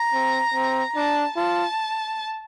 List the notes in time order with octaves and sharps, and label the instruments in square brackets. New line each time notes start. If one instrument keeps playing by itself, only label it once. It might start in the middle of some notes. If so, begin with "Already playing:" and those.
Already playing: [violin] A#5
[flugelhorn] C4
C4
[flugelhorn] D4 [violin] A5
[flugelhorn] F4 [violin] A5